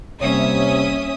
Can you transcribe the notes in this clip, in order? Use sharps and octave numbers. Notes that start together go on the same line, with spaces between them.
C3 G3 A#3 C#4 C#5 E5 D#6